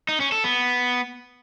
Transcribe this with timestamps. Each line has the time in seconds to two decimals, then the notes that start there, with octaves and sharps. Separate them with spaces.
0.09 D#4
0.20 C#4
0.32 A4
0.44 B3